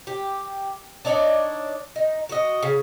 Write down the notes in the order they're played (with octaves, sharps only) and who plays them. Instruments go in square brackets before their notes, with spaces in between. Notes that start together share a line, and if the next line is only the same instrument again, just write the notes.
[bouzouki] G4
D4 D#4 C#5 D5
D#4
F#4 D#5
C#3